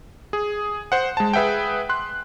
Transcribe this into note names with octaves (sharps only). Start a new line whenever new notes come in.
G#4
C5 F#5
G#3 A5
G#4 B4 E5 F#5 G5
C6 F#6